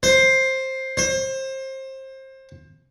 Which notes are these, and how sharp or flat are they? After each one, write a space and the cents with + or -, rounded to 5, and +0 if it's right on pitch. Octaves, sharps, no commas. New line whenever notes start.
C5 +10
C5 +25